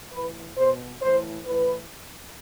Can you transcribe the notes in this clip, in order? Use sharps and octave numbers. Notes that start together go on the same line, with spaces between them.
A2 E3 B4
B2 C5
A2 E3 C5
A2 E3 B4